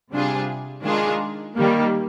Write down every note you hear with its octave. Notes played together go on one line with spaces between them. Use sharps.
C3 G3 D4 F4 G#4
D#3 G#3 D4 F4 G#4
D#3 G3 A#3